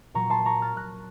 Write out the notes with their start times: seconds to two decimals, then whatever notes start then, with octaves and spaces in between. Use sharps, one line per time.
0.14 A#2 F#3 A#5 C#6
0.30 A5 C6
0.45 A#5 C#6
0.62 F6 A6
0.77 F#6 A#6